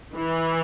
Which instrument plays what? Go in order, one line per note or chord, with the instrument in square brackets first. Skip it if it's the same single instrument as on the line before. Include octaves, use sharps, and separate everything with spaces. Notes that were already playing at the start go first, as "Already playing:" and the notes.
[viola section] E3